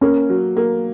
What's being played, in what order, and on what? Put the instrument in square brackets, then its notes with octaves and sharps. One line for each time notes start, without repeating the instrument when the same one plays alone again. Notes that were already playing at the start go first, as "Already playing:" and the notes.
[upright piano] A#3 [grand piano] C#4
[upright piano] F#3
A#3